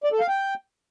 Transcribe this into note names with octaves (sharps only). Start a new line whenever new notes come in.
D5
A4
F5
G5